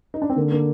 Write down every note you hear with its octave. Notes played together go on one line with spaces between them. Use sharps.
D#4
D4
C4
D3 A#3
A#3